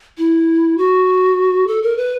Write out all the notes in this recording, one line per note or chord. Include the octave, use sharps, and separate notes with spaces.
E4
F#4
A4
A#4
B4